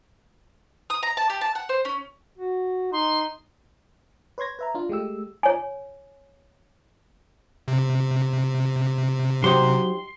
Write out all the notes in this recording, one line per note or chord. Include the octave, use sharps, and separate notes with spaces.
D#6
A#5
A5
G4
A5
F#5
C5
C#4
F#4
D#4 C6
B4 C#5 C6 G#6 A#6
B4 E5 A#5
D4 F4
G#3 A3 G4 E6
C#5 G#5
C3
F#3 D#4 G4 C5 C6